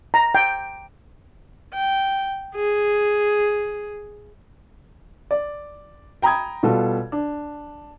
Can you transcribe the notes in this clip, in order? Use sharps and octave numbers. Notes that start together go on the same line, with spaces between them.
A#5
G5
G5
G#4
D5
G5 A#5 B5 D#6 G#6
B2 G3 F4 F#4 A4
D4